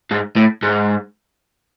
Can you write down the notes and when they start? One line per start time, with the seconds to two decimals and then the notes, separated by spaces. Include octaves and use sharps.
0.11 G#2
0.36 A2
0.63 G#2